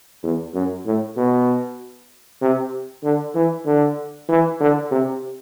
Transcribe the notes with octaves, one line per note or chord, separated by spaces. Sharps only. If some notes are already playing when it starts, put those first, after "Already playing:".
E2
F#2
A2
B2
C3
D3
E3
D3
E3
D3
C3